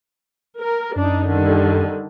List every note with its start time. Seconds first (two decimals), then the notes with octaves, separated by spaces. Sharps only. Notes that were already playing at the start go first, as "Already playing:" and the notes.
0.58 A#4
0.96 F#2 D4 D#4
1.28 D3 D#3 G3